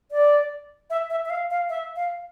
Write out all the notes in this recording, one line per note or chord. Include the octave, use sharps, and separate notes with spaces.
D5
E5
E5
E5
F5
F5
E5
F5